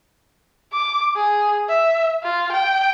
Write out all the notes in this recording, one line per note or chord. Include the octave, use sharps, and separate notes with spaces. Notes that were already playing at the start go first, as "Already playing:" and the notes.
D6
G#4
E5
F4
G5